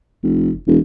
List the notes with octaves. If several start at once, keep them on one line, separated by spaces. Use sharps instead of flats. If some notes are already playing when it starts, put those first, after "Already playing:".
F1
E1